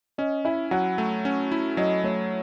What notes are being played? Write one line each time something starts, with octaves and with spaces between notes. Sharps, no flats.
C#4 D#5
E4 E5
F#3 F#5
A3
C#4
E4
F#3 D#5
A3 C#5